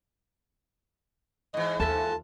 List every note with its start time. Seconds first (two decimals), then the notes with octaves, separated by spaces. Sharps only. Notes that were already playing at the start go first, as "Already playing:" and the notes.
1.54 G#2 E3 D#5
1.80 D#2 F4 A4 E5 A5